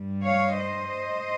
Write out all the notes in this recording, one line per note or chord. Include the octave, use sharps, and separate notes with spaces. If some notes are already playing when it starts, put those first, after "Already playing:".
Already playing: G2 G3
C#5 F5
C5 D#5